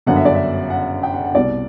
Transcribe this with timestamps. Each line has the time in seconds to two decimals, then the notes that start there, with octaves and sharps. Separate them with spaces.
0.06 G1 F#2 D3 F#5
0.16 E5
0.25 D5
0.34 E5
0.70 F#5
1.03 G5
1.14 F#5
1.24 F#5
1.34 C2 B2 D5